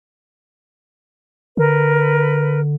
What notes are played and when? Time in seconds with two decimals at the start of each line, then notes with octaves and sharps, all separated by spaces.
1.57 D3 A#4 B4